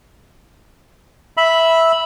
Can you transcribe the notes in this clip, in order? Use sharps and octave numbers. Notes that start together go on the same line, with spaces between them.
E5 B5